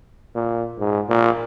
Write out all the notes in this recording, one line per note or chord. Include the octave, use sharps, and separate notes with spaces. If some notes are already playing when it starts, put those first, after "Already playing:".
A#2
G#2
A#2